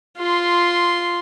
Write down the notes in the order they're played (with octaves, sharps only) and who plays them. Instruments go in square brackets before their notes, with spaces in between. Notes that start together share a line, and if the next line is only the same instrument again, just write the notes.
[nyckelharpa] F4 C6